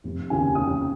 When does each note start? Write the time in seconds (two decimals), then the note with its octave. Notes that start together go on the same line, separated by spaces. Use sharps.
0.04 F1
0.30 D#2 C#3 G#5
0.55 F1 D#6